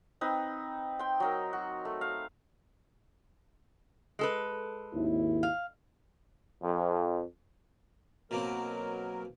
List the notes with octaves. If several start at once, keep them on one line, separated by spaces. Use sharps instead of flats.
C4 D#4 B4
G5 C6
F#3 D#4 A#4
F#4
A3
F5
G#3 A4 B4
G#1 D#2 E4
F5
F2
B2 F#3 A#3 C4 A#4